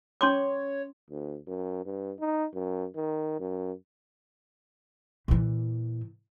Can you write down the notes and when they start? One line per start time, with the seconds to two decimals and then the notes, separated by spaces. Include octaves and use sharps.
0.21 C#4 C#5 C6 D6
1.10 D2
1.47 F#2
1.85 G2
2.20 D#4
2.54 F#2
2.95 D#3
3.40 F#2
5.28 A#2 E3